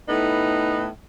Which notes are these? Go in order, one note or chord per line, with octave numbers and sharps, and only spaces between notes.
A2 B3 D#4